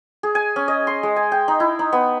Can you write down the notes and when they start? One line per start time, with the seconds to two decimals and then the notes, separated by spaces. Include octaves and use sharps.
0.23 G#4
0.35 G#5
0.56 C#4
0.68 D#5
0.87 C6
1.03 G#3
1.16 G#5
1.32 G5
1.48 D#4
1.60 E4
1.79 D#4
1.93 B3